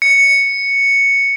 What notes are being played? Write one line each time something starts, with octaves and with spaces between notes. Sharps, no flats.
C#7